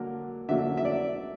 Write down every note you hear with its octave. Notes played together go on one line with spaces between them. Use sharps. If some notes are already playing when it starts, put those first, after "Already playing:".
Already playing: D3 F#3 A#3
D3 F#3 A#3 E5
E5
D5